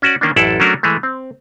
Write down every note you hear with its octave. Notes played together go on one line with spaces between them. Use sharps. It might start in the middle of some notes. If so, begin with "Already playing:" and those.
C#4 F#4 D5
D#3 A#3 C#4 D4
A1 F#2 E4 A4 D5
F#3 A3 C#4 D4 F#4 A#4
E3 G#3 A3
C4